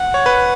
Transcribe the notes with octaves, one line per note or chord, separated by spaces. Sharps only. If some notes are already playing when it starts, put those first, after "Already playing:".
Already playing: F#5
C#5
B4